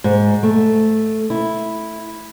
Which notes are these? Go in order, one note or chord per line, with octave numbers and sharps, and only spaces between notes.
G#2
A3
E4